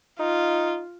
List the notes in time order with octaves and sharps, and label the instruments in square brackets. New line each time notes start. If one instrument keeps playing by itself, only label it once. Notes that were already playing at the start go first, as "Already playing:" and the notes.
[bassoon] D#4 [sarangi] F4